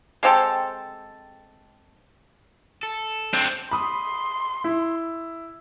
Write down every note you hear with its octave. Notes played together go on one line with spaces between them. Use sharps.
G#3 C4 G4 A4
A4
C4 D4
B5 C6 D#6
E4